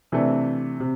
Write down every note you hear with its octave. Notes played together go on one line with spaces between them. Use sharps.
C3 E3 A3 D4
C3